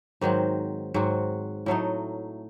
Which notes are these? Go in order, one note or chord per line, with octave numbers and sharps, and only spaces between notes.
G#2 D#3 F#3 C4
G#2 F#3 C4 F#4
A2 F#3 A3 D#4